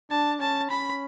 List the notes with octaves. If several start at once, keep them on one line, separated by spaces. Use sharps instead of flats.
D4 A5
C#4 A5
C#4 B5